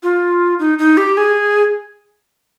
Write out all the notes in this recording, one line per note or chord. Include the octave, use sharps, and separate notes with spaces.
F4
D#4
D#4
G4
G#4